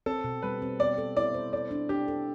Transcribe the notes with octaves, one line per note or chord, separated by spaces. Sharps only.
C4 A4
B2
G3 B4
C4
B3 D5
A4
E4 D5
C5
A4 D5
D4
D4 G4
A4